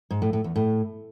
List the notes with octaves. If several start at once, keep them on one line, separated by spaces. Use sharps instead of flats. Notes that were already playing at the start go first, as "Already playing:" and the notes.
G#2
A2
A2
E2
A2